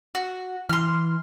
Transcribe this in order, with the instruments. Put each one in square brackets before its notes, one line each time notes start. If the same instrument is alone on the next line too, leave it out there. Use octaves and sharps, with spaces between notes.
[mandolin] F#4
[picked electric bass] E3 [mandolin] C6 F6